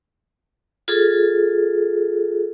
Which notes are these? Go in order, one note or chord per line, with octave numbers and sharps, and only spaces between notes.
F4 G#4 A4